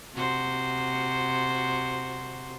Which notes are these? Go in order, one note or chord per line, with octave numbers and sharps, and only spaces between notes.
C3 F#4 C5